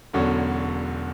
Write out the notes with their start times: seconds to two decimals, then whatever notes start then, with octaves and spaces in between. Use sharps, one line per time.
0.13 E1 E2 D3 F#3 C#4